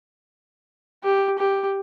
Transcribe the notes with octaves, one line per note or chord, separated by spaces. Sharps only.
G4
G4